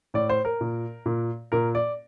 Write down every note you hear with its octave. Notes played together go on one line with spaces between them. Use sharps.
A2 D5
C5
A#4
A#2
A#2
A#2 A#4
D5